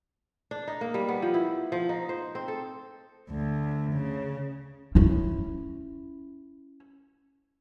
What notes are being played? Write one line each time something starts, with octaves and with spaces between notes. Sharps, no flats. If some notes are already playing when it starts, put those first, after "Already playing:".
D4
D#4
A#3
G3
B3
F3
E4
F3
D#4
C5
C4
A4
D2
C#3
C#4 E4